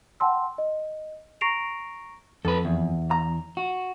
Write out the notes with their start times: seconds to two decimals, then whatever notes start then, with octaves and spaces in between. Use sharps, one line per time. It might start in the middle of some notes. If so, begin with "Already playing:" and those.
0.20 F#5 G5 A5 C6 E6
0.58 D#5
1.41 A#5 C#6 A#6 C7 D7 F7
2.45 F2 A4 B4
2.65 E2
3.11 A#5
3.57 F#4